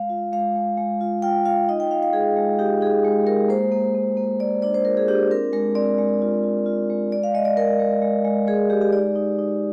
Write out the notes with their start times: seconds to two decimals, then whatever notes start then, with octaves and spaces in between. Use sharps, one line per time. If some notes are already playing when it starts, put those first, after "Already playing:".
Already playing: G#3 F5
0.09 F4
0.33 G#3 F5
0.56 G#3
0.78 G#3
1.01 F4
1.22 F4 G5
1.45 F4 F5
1.69 D#4 D#5
1.80 G5
1.91 D#4 F5
2.03 F5
2.13 G#3 G#4
2.37 G#3
2.59 D#4 G4
2.81 D#4 G#4
3.05 G#3
3.26 G#3 A#4
3.49 A#3 C5
3.72 A#3
3.95 A#3
4.17 A#3
4.40 A#3 D5
4.62 D4 D5
4.74 C5
4.85 F4 A#4
4.97 G#4
5.08 D4 G4
5.31 C4 A#4
5.53 G#3 A#4
5.75 C4 D5
5.98 G#3
6.22 F4
6.43 F4
6.66 F4
6.90 G#3
7.12 G#3 D5
7.23 F5
7.34 G#3 D#5
7.45 D5
7.57 G#3 A#4
7.79 G#3
8.02 G#3
8.24 G#3
8.47 G#3 G#4
8.70 G#3 G4
8.81 G4
8.93 D#4 D5
9.16 D#4
9.39 D#4